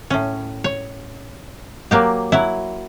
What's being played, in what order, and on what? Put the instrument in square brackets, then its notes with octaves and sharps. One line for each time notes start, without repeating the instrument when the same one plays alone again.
[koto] A2 C#4
C#5
F#3 A#3 G4
F#3 E4